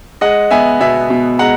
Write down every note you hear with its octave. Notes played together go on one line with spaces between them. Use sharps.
G#3 D#5 F#5
B3 E5 G#5
B2 E5 G#5
B2
G#3 F#5 A#5